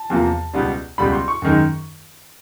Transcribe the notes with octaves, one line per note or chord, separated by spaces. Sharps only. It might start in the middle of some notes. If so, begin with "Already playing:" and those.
Already playing: A5
E2 C3 F3 A#3
C#2 B2 G3 B3
C#2 B2 G3 B3 B5
C6
C#6
F#2 D#3 G#3